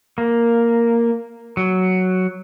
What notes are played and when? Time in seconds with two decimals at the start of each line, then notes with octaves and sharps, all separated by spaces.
0.18 A#3
1.57 F#3